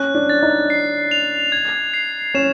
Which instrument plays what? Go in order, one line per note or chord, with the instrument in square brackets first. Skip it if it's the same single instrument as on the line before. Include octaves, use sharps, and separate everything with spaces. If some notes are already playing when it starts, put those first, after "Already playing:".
Already playing: [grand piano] C#4 [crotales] F#6
[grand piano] D4
[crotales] A6
[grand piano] D#4
[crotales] C7
F7
G#6
C7
[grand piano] C#4 [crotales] E7